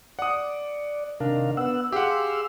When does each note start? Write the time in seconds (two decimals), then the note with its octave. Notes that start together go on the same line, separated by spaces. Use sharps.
0.19 D5 F#5 D#6
1.20 C3 D#3 D4 A#4 F5
1.57 B3 F#5 E6
1.92 G4 G#4 F5 F#5 C6 E6